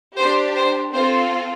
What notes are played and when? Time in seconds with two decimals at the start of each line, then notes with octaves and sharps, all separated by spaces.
0.17 D4 G4 C5
0.55 C5
0.93 C4 F4 A4 C5